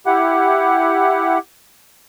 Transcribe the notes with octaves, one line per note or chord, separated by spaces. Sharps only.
E4 G4 F#5